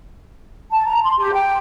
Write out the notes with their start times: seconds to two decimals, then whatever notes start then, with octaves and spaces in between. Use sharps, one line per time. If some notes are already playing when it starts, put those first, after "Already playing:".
0.71 A5
0.86 A#5
1.03 C6
1.18 G4
1.32 G5